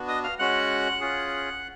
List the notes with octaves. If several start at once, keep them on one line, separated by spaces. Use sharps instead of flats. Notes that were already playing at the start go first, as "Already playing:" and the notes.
Already playing: B3 D4 F#4
D#5 D#6
F5 F6
G#3 C#4 F#4 F#5 F#6
C#4 F4 G#4